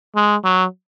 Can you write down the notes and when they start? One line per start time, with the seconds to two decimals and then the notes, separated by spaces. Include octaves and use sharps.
0.15 G#3
0.44 F#3